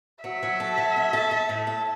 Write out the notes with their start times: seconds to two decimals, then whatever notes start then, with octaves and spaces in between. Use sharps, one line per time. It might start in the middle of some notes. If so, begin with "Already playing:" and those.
0.24 F#3 E5
0.43 F#3
0.60 A4
0.77 F#3
0.96 C#4
1.13 A4
1.31 A4
1.49 A2
1.67 A4